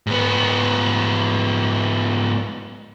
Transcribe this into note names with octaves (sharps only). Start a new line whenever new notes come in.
G#2 B3